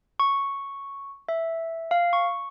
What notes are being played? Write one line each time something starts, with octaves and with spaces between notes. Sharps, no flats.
C#6
E5
F5
C#6